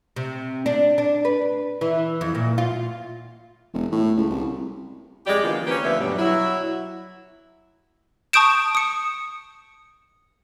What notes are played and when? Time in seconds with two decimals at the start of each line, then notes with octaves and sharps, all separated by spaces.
0.16 C3
0.66 D4
0.98 D4
1.25 B4
1.81 E3
2.21 F2
2.35 A#2
2.58 F4
3.73 E1
3.92 A2
4.17 C#2
4.30 C2
5.26 F2 G3 G#3 G4 D5
5.44 D3 E3 F3 A#3 B3 F4
5.66 A#3 C4 C#4 G4 B4
5.84 D2 D3 F3 B3 B4 E5
6.00 G2 B2 F#3 G3
6.18 F#3 E4
8.33 A5 C#6 D#6 G6 D7 E7
8.75 D#6 C#7